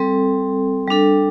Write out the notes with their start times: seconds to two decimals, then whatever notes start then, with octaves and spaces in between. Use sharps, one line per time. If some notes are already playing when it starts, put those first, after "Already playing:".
Already playing: G3 C4 A4
0.87 G3 D4 A4